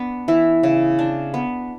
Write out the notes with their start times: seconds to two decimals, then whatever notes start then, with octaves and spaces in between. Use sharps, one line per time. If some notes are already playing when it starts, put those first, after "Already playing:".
Already playing: B3 D4
0.28 E3 E4
0.63 C#3
0.99 D4
1.34 B3